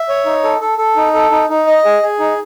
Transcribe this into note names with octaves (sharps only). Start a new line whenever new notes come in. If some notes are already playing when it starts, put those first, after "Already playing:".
Already playing: E5
C#5
D#4
A4
A4
A4
D#4
A4
D#4
D#4
D#5
G#4
G#4
D#4